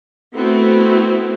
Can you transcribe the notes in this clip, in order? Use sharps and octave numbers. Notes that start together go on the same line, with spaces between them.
A3 B3 C4 E4 F#4